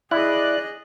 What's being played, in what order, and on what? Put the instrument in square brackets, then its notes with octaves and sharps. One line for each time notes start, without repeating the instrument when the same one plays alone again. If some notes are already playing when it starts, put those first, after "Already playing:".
[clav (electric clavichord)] E4 [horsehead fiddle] G#4 D#5 [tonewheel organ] D5 F#6